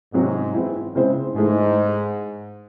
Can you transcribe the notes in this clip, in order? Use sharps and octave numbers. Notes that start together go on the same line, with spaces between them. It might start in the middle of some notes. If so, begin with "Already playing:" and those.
G#2 C3 F#3 C4 F#4
E3 C4 E4
C#3 G#3 C4 E4 C5
G#2 E3 A3 D#4 G#4